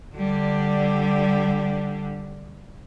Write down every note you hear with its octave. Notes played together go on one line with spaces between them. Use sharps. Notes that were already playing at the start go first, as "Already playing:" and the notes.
D3 G3